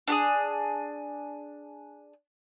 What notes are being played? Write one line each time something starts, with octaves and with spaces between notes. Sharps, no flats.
D4 G4 G#4